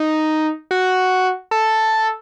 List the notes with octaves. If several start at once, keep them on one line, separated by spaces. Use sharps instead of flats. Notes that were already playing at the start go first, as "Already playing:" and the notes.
Already playing: D#4
F#4
A4